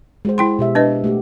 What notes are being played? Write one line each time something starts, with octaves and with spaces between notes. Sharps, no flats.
G#3 F#4 C5
E4 G5 C6
B2 G4 E5
D4 B4 D#5
A3 F#4 G4